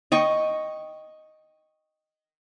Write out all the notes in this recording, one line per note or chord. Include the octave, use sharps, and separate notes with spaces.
D#5 G5 C#6